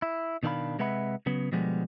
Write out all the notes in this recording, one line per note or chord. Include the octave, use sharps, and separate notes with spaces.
E4
B2 D#3 D4 G4 F5 B5
C3 G#3 B4 E5 F#5 B5
C#3 F#3 B3
B2 D3 F3 G3 G#3 B3